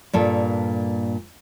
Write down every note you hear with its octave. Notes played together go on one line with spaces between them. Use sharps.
G2 A#2 A4